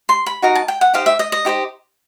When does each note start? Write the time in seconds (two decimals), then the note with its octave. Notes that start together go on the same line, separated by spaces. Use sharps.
0.09 C6
0.26 B5
0.42 D#4 F#4 A#4 A#5
0.55 A5
0.68 G5
0.81 F#5
0.94 D#4 G4 C5 D#5 F5
1.06 E5
1.19 D#5
1.32 D#5
1.45 D#4 G4 C5 D#5